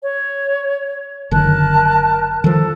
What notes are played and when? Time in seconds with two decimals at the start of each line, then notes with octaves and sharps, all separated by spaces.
0.04 C#5
1.31 F#1 D3 D#3 A#4 A5 F#6
2.44 D#3 F3 A4